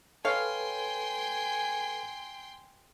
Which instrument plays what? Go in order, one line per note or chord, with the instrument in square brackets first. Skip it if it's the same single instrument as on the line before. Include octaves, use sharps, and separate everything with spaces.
[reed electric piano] A4 B4 [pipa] C#5 F5 [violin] G5 C6 [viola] G#5